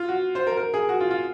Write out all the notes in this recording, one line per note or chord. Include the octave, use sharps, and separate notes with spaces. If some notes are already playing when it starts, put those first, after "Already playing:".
Already playing: F4
F#4
C5
A#4
A#4
G#4
F#4
F4
F4